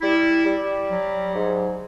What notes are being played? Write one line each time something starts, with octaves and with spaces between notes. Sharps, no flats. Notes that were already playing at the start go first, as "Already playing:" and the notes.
G3 E4
G3
F#3
G#2